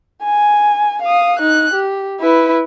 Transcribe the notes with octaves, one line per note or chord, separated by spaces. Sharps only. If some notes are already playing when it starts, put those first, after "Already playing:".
G#5
F5 D#6
D#4 F#6
G4
E4 B4